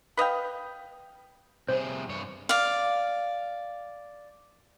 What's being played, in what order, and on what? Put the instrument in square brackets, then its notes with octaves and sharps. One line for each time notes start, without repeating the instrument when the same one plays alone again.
[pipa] B4 D#5 F5 G5
[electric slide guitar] C3 G3 G#4 [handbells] C5
[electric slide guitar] G2 C#5
[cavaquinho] D5 F5